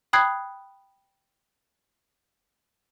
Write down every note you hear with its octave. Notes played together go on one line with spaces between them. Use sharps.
G5 B5 D#6 F#6 G#6 C7